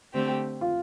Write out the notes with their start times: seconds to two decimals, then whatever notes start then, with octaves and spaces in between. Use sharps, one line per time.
0.14 D3 A3 C4 G4
0.61 F4